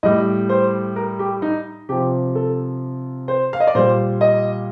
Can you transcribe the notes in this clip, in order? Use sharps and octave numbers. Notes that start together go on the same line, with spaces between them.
A2 G3 D#5
C5
A#4
G4
D#4
C3 F3 G4
A4
C5
F5
D#5
D5
A#2 G3 C5
D#5